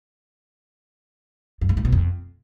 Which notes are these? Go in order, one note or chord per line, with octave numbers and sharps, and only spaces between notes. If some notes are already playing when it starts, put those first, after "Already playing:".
F#2
G#2
A2
B2
F2